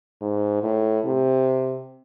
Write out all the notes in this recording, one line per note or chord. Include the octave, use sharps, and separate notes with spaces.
G#2
A2
C3